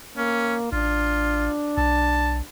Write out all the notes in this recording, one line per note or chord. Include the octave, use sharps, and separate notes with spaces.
A#3 C#4
A1 D4 F4
B1 A5